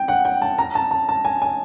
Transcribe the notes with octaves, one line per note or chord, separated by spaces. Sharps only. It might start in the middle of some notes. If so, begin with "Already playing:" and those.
Already playing: G5
F#5
G5
A5
A#5
A5
A5
A5
G#5
G#5